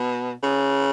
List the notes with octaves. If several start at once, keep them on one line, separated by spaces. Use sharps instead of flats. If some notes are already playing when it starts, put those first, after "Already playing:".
Already playing: B2
C#3